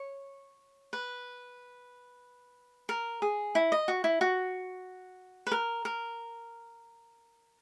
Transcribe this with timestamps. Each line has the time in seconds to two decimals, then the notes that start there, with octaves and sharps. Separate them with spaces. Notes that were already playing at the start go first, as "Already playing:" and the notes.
Already playing: C#5
0.93 B4
2.89 A#4
3.22 G#4
3.55 E4
3.72 D#5
3.88 F#4
4.04 E4
4.21 F#4
5.47 B4
5.52 A#4
5.85 A#4